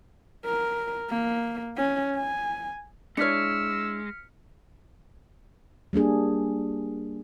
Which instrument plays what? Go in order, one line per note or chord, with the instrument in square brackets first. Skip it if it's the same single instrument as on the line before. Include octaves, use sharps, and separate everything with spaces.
[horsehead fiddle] A#4
A#3
C#4
G#5
[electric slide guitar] G#3 [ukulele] D4 E4 C#5 [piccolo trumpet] E6 [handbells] F6 B6 C#7
[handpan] G3 A#3 D4 G#4